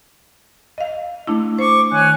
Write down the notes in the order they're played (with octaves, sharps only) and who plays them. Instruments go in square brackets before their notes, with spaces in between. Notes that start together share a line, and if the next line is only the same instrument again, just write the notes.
[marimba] D#5 F5
A3 D4 E4
[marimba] C5 [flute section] C#6 D6
[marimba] D#3 [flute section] C#5 G#5 F#6